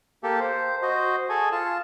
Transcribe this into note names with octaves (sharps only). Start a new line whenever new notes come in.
A#3 G4 A4
C5
F#4 C5 D#5
G#4 A4 G#5
F4 A5